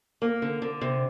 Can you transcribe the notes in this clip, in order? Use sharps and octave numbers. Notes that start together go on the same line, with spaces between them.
A#3
D3
D3
C3